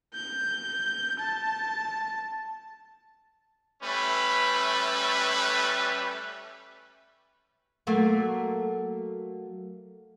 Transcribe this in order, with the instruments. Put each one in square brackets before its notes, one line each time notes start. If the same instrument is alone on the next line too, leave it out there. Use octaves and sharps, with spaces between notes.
[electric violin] G6
A5
[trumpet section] G3 A3 C#4 B4 E5
[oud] F#3 A3 A#3